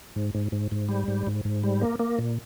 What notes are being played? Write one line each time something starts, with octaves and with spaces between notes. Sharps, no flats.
G#2
G#2
G#2
G#2
G3
G#2
G#2
G#2
G3
A#3
A#3
A#2